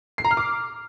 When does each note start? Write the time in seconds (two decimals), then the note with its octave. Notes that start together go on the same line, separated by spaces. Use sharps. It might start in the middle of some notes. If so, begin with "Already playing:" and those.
0.18 C7
0.25 A#5
0.31 F6
0.37 D6